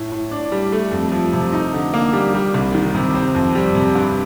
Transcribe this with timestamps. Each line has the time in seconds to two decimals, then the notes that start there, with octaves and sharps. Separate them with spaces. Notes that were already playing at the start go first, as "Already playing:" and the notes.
Already playing: A2
0.12 A2
0.31 D4
0.52 G3
0.72 A3
0.92 F2
1.12 F3
1.33 C3
1.53 D#4
1.74 D3
1.94 A#3
2.13 G3
2.34 G3
2.54 C2
2.75 D#3
2.95 C3
3.15 C4
3.35 F2
3.55 G3
3.75 C3
3.95 G2